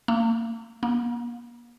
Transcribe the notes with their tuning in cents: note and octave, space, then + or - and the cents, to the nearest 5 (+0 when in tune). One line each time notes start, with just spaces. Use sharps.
A#3 -35
A#3 +40